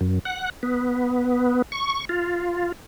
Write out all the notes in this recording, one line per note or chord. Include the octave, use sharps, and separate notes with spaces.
F#2
F#5
B3
C#6
F4